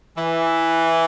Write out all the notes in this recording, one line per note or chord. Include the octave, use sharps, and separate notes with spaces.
E3